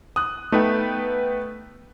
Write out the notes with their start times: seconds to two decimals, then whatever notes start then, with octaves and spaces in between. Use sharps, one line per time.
0.16 D#6 F#6
0.52 A3 B3 D#4 B4 G5